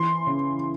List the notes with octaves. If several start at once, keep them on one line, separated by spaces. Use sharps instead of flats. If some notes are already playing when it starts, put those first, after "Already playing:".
Already playing: E3 C6
C#3